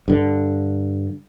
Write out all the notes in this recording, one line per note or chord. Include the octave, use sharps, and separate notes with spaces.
G2 D3